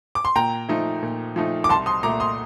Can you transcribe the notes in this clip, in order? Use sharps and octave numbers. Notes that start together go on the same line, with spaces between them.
D6
C6
A#2 G5 A#5
F3 A3 D#4
A#2
F3 A3 D#4
D6
C2 A5 C6
C6 D#6
A#2 A3 A#5 D6
C6 D#6